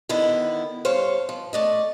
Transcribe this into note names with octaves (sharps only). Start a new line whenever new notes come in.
D3 D#3 B3 E4
G2 C5 C#5 F5
F3
A3 D5 D#5